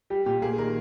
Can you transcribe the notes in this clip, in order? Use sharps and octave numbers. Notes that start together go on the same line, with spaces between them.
G3 G4
A#2 G4
A#3 G#4
D#3 A#4